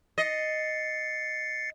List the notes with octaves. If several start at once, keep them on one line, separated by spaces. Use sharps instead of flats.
D#5 A6 C7 C#7